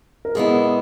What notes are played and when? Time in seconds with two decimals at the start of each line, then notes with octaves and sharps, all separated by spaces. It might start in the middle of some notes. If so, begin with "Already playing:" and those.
0.25 A#4
0.35 A#2 G#3 B3 E4 G#4